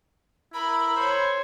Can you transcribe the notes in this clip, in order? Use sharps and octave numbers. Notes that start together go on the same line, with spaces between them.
E4 A#4 B5
C5 C#5 G#5